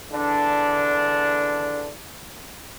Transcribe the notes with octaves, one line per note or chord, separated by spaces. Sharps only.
E2 D3 D4